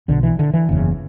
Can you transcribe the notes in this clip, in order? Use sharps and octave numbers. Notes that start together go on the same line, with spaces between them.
B1 B2 D3
E3
D3
E3
F#1 E2 C#3